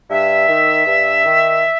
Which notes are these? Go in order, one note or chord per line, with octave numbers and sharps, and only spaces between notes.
G2 E5
D#3
G2
D#3